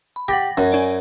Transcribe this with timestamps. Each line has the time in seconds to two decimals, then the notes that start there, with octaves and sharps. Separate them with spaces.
0.16 B5
0.28 G4 F#5 A6 A#6
0.57 F#2 C#4
0.70 C#4 D5 G#5